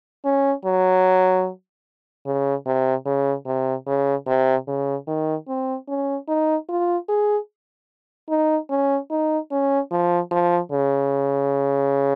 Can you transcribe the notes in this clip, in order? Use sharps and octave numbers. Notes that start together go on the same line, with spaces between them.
C#4
F#3
C#3
C3
C#3
C3
C#3
C3
C#3
D#3
C4
C#4
D#4
F4
G#4
D#4
C#4
D#4
C#4
F3
F3
C#3